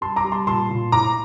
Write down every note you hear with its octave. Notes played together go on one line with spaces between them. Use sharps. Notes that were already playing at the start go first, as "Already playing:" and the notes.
G3 A5 C6
A#5 D6
G3
A5 C6
A#2 A5 C6
A#2
A2 A#5 D6